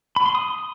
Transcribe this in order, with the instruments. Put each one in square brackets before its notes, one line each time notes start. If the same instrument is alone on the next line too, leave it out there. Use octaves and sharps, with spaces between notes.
[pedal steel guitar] B5
C6
D#6